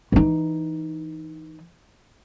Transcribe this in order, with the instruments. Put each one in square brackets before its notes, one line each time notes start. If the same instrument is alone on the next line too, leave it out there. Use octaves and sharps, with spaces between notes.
[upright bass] E3 D#4